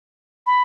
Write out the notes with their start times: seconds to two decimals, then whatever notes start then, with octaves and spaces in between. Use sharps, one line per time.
0.46 B5